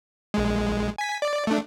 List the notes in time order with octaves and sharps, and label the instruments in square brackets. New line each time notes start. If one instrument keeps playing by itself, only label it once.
[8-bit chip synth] A#1 G#3
G#5 B6
D5
A3 D4